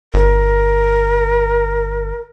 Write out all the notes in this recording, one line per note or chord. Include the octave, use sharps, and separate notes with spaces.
G1 A#4